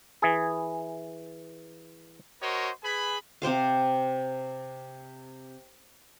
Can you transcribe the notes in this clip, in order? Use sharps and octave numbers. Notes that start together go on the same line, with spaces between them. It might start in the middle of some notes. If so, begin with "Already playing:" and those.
E3 G#4
F#4 A#4 C5 C#5 D#5
G#4 B4 G#5 B5
C3 G4 C5 F5